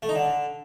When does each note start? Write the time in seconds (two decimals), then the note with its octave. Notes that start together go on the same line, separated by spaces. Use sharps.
0.02 A3
0.09 D#4
0.15 D3